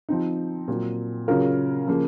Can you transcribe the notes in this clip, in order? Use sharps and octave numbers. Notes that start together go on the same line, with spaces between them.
F3 C4 D#4
A#2 F#3 C4
C#3 F#3 C#4 F4 A#4
C#3 F3 A#3